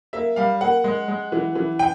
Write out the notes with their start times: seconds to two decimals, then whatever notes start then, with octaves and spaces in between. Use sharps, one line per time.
0.13 A#3 E5
0.36 G3 F5
0.61 A#3 F#5
0.84 G#3
1.08 G#3
1.32 E3
1.55 E3
1.79 G5